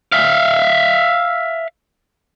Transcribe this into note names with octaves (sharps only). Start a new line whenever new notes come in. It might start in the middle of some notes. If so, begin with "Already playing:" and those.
E5 F5